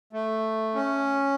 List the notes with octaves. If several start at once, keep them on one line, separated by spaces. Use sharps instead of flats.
A3
C#4